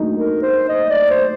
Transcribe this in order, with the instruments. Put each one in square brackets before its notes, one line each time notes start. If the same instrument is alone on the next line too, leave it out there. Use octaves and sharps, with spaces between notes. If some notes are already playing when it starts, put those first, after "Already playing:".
Already playing: [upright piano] A3 A#3 D4 D#4 F#4
[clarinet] A#4
C5
D#5
D5
C5